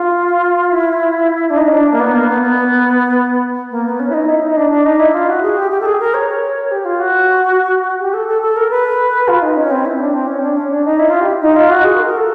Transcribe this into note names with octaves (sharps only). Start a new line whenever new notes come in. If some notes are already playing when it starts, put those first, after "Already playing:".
Already playing: F4
E4
D4
D#4
C#4
D4
A#3
B3
A#3
B3
B3
A#3
B3
C#4
E4
D#4
E4
D#4
D4
D4
D#4
E4
F4
F#4
G#4
G4
G4
A4
G#4
A#4
C#5
G4
F4
F#4
G4
A4
A4
A4
A#4
B4
F4
D#4
C#4
C4
E4
D4
C4
C#4
D4
C#4
D4
D#4
E4
F4
G4
D#4
F4
F#4
G#4
A#4
A#4
A4